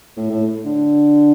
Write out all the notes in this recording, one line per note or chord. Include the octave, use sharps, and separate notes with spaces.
A2
A2
D3